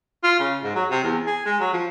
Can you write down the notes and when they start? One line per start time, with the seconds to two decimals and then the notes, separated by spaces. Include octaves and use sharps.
0.24 F4
0.40 C#3
0.64 G#2
0.76 F#3
0.91 C3
1.03 E2
1.27 G#4
1.46 G#3
1.60 F#3
1.73 F3